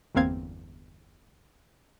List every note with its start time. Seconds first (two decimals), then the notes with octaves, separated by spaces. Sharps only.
0.15 G1 E2 A#3 C4 F5 G#6